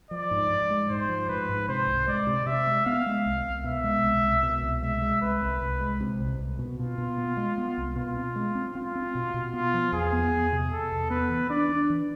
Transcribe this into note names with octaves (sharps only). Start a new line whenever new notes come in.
F3 D5
G#2
G#2
G#3
G#2 C5
F3
G#2 B4
G#2
C3 C5
C2
G#3 D5
C3
C3 E5
G#3
B3 F5
G#3
C2
C2
B2 E5
G#3
C2
C2
B2
C2
G#3 E5
G#3
C2 B4
C2
C2
G#3
C3
C2
C2
B2
B2 F4
B2
B3
G#3
B3
C2
B2 F4
C4
G#3
C4
C4 F4
C4
B2
B2
B3 F4
F3
E2 G#4
B3
E2
C3
C3 A4
E2
B3 B4
E3
D4 D5
D4
E3